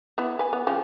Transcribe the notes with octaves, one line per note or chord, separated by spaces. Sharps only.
B3 E4
B4 G#5
B3
C#3 F3 G5